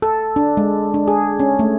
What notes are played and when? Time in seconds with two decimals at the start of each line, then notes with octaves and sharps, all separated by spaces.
0.02 A4
0.36 D4
0.57 G#3
0.94 D4
1.08 G#4
1.40 C#4
1.59 A3